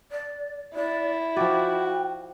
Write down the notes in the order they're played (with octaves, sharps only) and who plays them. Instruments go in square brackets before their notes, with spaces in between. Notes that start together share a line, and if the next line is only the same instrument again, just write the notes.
[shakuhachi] D5
[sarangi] E4 [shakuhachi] D5
[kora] F3 D5 [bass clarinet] F#4 [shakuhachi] G5